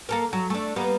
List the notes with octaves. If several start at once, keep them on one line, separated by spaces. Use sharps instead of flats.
A#3 A4 A#4
F#3
A3 D4
G3 A#3 B3